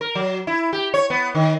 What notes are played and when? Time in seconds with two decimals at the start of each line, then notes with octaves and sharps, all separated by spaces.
0.01 A#4
0.15 F#3
0.47 E4
0.73 G4
0.94 C#5
1.10 B3
1.35 D#3